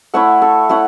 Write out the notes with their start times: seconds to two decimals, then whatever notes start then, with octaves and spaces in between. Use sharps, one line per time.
0.14 A3 E4 C#5 F#5
0.42 A4
0.69 A3 E4 C#5 F#5